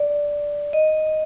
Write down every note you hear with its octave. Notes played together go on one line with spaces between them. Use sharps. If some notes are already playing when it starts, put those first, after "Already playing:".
Already playing: D5
D#5